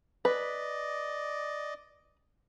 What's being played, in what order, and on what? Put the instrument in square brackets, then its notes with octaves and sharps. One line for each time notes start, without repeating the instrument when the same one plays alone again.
[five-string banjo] B4 [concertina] D5 D#5